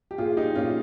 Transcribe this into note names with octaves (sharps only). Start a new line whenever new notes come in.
G4
A#2 F4 G#4
D#4 G4
A#2 C#4 F4